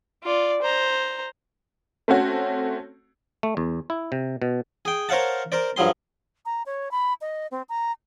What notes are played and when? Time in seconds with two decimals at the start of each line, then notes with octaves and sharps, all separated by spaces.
0.23 F4 D5
0.61 C5 A#5
2.08 A3 C4 C#4 F#4 C#5
3.43 A3
3.57 E2
3.90 E4
4.12 C3
4.42 B2
4.85 G#4 G5
5.09 A#4 C5 C#5 F5 F#5 A5
5.52 A#4 C5 D5
5.76 G2 F3 F#3 G#4 C6
6.45 A#5
6.66 C#5
6.91 B5
7.21 D#5
7.51 C4
7.69 A#5